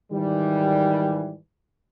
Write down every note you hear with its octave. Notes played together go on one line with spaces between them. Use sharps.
G#2 D#3 E3 G3